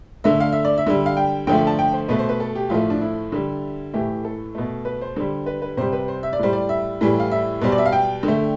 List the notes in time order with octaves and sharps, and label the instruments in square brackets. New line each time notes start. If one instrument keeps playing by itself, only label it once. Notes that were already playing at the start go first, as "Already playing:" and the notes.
[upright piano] D3 A3 E5
F5
E5
D5
E5
D3 G3
F5
G5
D3 F3 A3 G5
A5
G5
C5
B2 A3 B4
C5
B4
A4
G4
A2 F3 A3 F4
D4
E4
D3 G3
A2 E3 A3 G4
A4
B2 A3
B4
C5
D3 G3
B4
B4
C3 G3 C5
B4
C5
E5
D5
A2 G3 C5
D5
E5
A2 E3 G3
F5
E5
B2 G3 C5
D5
E5
F5
G5
D3
A3